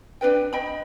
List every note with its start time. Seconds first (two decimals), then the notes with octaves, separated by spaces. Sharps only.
0.21 D4 F#4 B4 G5
0.53 D#5 G5 B5